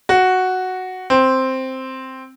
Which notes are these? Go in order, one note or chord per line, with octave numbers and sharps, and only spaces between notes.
F#4
C4